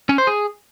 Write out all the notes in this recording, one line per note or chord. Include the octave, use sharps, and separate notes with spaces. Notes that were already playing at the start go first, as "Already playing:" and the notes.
C#4
C5
G#4